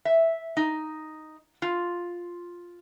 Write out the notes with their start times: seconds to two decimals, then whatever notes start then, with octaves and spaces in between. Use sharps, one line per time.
0.05 E5
0.57 D#4
1.62 F4